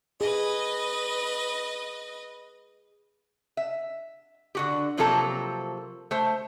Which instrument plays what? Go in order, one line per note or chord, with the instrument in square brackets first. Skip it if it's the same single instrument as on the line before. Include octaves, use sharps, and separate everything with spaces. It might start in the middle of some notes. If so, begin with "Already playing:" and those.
[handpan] G#4 [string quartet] B4 D#5
[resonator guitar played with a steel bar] E5
D3 F#4 G4
C3 F3 F#3 A#3 A4 A#5
A3 C5